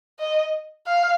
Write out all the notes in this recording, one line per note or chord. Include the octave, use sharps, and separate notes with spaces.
D#5
F5